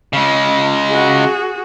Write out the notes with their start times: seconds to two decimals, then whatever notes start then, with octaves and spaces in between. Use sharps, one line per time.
0.13 C#3 G#3
0.88 F#4 G#4